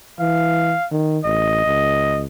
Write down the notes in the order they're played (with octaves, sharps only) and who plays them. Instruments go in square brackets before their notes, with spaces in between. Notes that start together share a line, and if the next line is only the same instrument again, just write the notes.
[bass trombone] E3 [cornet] F5
[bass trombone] D#3
[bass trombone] A1 [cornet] D#5
[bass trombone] C#2